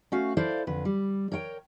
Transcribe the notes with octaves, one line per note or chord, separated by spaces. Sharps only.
A3 C#4 F#4 F5
E4 A4 C5 D5 F5
F2 D3 B4
G3
A#4 C#5 F#5 G5